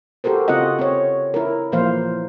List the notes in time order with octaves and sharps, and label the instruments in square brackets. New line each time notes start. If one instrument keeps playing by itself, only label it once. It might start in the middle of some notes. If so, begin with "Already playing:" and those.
[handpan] F#4 G4 A4 A#4 C5
C#3 C4 F4 F#4 D#5 F#5
C4 C#5
E4 A#4
A#2 E3 F3 A#3 C5 F5